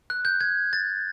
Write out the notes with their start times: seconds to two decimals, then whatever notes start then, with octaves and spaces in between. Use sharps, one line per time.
0.10 F#6
0.25 G6
0.41 G#6
0.73 A6